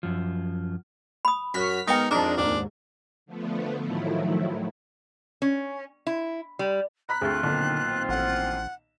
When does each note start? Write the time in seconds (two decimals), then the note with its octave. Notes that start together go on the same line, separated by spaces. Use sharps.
0.03 F#2 F3
1.25 B5 D#6
1.54 F#2 F#4 F6 B6
1.88 G#2 B3 D#4 A#4 G5 C#6 D#6
2.11 F2 G#3 D4 D#4 A#4
2.37 D#2 G#2 D4
3.26 D3 F3 A3 B3
3.80 A2 D#3 F3 F#3 A3 E4
5.42 C#4
6.07 E4
6.59 G3
7.09 A#5 B5 F#6 B6
7.21 D2 A3 C4 F4 G#4
7.43 B1 A#2 D3 D#3
8.09 A1 F#5